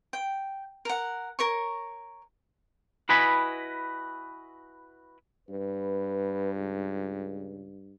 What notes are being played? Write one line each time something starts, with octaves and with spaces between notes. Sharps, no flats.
G5
A#4 F#5
A#4 C#5 C#6
E4 F#4 B4 D#5 G#5 B5
G2 B4
C#2